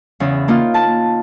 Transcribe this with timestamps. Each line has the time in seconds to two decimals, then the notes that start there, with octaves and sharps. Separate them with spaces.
0.20 E2 C#3
0.48 A#3 D#4 F4
0.74 A5